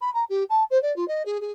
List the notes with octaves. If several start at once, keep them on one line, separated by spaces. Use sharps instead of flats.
B5
A#5
G4
A5
C5
D5
F4
D#5
G#4
G#4